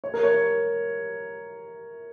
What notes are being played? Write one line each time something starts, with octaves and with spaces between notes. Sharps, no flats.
C#5
A#4
C#5